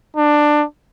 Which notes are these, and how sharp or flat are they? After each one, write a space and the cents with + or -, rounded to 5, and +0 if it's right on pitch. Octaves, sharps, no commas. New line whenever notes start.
D4 +15